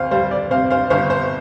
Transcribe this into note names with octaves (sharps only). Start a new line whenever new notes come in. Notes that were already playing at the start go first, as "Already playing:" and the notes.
Already playing: D2 C4 C5 F5
G3 C5 F5
D5
C3 C5 F5
C5 F5
G1 C5 F5
C5